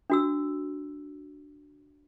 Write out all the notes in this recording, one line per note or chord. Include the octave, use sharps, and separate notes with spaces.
D4 F#4 E6